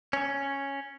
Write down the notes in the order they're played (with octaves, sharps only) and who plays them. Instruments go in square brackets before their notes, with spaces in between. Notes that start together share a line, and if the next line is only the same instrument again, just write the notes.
[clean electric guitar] C#4